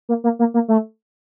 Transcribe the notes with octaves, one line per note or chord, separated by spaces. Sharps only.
A#3
A#3
A#3
A#3
A3